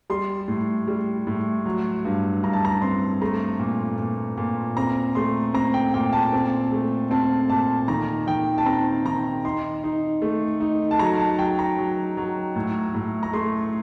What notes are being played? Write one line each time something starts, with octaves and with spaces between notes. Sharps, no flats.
G3 C6
A2
G3
A2
F#3
G2
G2 A#5
A5
A#5
C4 C6
A3 A#5
A#2
A#2
A#2
C4 A#5
A3 C6
C4 A#5
G5
A#2 G5
A5
C4
A3
C4 A5
A#2 A5
D#3 A#5
D#3 G5
A5
C4 A#5
D#3 A#5
D#4 C6
D#4
A3
D#4
A5
F#3 A#5
A5
F#3 G5
A#5
F#3
F#3
A2
A2
A#5
A3 C6